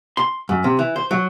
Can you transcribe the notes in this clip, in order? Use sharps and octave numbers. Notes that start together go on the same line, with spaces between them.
C6
F#2
C3
E3
C5
F#3